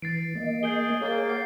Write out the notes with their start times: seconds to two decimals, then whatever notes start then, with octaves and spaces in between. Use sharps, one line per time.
0.02 E3 A6 C7 D7
0.35 A#3 D#5
0.63 G#4 G6 D7 G7
1.01 A#3 G#4 C#5 A6 G7
1.29 F#5 D6 C7